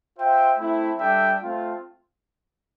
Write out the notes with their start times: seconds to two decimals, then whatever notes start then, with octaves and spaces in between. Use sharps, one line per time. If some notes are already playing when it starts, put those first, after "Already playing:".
0.17 F4 C5 E5 G5
0.58 A3 C4 E4
0.99 G3 D4 A4 E5 G5
1.40 A3 C4 F4